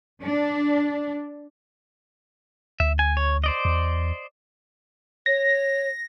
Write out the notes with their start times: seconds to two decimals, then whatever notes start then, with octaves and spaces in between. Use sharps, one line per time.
0.23 D4
2.80 D2 E5
2.99 G#5
3.17 C#5
3.44 C5 D5 D#5
3.65 E2
5.26 C#5 A#6